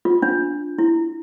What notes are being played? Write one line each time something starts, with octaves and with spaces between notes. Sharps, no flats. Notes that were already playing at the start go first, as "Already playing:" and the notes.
F4
D4
E4